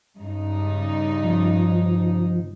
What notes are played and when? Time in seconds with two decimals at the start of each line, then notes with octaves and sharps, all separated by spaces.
0.18 G2 C#3 D#4
1.24 F3